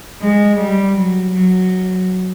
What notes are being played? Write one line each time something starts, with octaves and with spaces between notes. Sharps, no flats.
G#3
G3
F#3
F#3